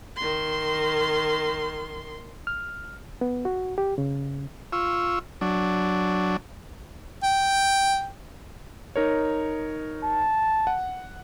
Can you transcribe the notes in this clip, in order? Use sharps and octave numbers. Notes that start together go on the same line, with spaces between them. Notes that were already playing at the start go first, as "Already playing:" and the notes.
D#3 C6
F6
B3
F#4
G4
C#3
F4 C#6 E6
F#3 D4
G5
D#4 A#4 C#5
A5
F#5